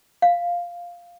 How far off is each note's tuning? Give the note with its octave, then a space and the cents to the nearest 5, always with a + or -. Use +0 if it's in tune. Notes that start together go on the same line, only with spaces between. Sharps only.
F5 +0